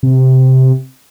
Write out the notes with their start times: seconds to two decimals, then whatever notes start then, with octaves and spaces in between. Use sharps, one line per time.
0.03 C3